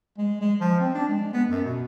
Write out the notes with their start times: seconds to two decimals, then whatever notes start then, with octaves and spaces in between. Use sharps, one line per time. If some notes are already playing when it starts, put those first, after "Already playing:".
0.18 G#3
0.42 G#3
0.61 F3
0.80 C4
0.95 D4
1.08 G#3
1.34 B3
1.49 F#2
1.65 B2